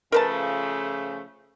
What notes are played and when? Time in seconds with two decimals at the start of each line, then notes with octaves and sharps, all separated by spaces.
0.12 C#3 F3 A3 A#4 B4 A5